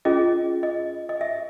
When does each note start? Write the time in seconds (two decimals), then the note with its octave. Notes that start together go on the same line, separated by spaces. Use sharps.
0.05 C#4 F4 G#4 D#5
0.63 D#5
1.09 D#5
1.21 E5